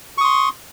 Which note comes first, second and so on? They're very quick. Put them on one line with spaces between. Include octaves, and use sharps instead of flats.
C#6 D#6 C6